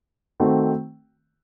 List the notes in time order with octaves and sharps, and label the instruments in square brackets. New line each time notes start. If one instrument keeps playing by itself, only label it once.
[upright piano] D#3 A3 C4 F#4